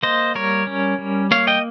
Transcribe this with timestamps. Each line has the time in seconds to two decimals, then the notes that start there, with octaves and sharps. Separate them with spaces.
0.03 A#3 C5 D#5
0.35 G3 A#4 C#5
0.67 C#4
0.99 G3
1.31 A#3 C#5 F5
1.47 D#5 G5